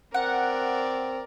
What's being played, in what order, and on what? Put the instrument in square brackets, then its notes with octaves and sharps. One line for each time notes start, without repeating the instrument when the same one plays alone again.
[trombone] C4 [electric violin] A#4 D5 [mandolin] F#5